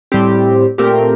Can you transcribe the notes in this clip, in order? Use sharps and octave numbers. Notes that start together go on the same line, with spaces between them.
A2 G3 C4 G4
A#2 A3 C4 G4 A#4